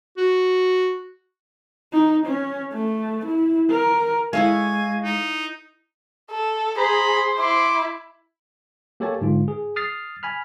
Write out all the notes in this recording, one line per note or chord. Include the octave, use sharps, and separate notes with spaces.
F#4
D#4
C#4
A3
E4
A#4
G#3 E4 A4 C#5 F5 G#5
D#4
A4
G#4 C5 A#5 B5
E4 C6 D6
A#3 G4 A4 C#5 G#5 A5
G#2 D3 F4
G#4
D#6 F6 A6 C7
G#5 B5 F6